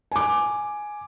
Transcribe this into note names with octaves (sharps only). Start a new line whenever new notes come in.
G#5 D6